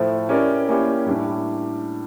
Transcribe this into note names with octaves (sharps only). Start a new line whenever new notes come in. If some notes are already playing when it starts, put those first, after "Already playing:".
Already playing: A2 F3 A3
C#4 E4 G4 A#4 D5
A#3 C#4 E4 G4
A2 G3 D4